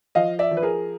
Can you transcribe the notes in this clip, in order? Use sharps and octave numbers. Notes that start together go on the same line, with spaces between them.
F3 D#5 F5
D5 E5
F3
B4
G#4 A#4